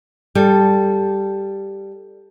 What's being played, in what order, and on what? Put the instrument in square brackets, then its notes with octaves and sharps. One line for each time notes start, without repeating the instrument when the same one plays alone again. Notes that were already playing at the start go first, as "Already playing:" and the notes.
[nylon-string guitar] G3 A4